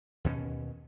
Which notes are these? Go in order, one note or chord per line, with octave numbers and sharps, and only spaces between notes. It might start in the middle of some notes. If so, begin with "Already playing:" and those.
D#2 B2 B3 C#4